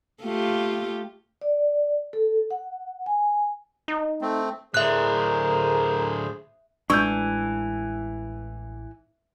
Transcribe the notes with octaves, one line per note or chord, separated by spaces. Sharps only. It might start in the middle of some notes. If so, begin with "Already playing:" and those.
A3 F4 G4
D5
A4
F#5
G#5
D#4
A3 C4
A2 D3 G#4 A#4 C5 E5 F#6
A1 E3 G#3 D4 C#6 E6 G6